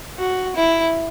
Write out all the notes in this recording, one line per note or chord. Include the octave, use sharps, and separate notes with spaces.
F#4
E4